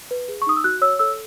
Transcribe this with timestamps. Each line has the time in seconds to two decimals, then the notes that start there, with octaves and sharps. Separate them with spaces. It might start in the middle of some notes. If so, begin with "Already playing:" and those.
0.11 B4
0.28 G#4
0.42 C#6
0.46 D#4 D#6
0.56 E6
0.64 F#4 F#6
0.82 C#5 E6
0.99 A4 E6